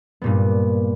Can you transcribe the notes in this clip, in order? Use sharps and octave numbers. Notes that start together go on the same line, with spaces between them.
G2 A#2 B3